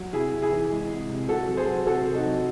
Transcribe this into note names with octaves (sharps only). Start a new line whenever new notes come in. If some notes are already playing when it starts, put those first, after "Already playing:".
Already playing: F#3
C3 E4 G#4
C3
E4 G#4
E3
G#3
C3
C3
C3 F#4 A4
F#3
G#4 C5
F#3
C3 F#4 A4
C3
D#4 F#4
F#3